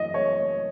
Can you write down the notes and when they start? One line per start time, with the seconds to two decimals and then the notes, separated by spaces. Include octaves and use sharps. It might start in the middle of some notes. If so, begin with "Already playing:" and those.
Already playing: F#2 E3 D#5
0.14 C#5